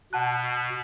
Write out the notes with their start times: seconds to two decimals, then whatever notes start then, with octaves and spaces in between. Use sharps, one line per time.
0.13 B2 F#5 A5 F#6